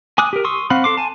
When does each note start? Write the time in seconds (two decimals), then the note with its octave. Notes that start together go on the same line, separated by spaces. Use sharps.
0.18 G#5 D6 D#6 F#6
0.33 G4 A#4
0.45 C6 C#6 D#6 E6
0.70 C4 F5 F#5 B5
0.84 A4 C6 D6
0.97 G#5 A5